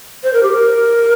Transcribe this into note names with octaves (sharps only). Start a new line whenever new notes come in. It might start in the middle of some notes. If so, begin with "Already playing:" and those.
C5
A#4
G4
A#4